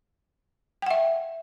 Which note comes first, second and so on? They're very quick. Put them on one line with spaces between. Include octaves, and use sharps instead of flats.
G5 F#5 E5